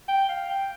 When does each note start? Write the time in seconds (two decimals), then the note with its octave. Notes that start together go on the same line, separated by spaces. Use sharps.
0.08 G5
0.29 F5
0.50 G5